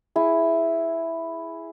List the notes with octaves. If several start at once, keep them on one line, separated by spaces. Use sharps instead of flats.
E4 G#4